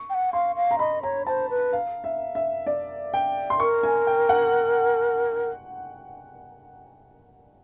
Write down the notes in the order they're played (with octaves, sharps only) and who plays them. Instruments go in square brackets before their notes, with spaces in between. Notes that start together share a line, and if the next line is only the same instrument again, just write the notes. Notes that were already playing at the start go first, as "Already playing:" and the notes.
Already playing: [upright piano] C#6
[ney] G5
F#5
[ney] F5 [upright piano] C6
[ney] F5
[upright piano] A#5
[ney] D#5 [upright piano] B5
[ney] C#5 [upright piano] A#5
[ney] C5 [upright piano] A5
[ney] B4
[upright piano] F5
E5
E5
D5
G5
C6
[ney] A#4 [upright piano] C#6
[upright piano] G#5
G5
F#5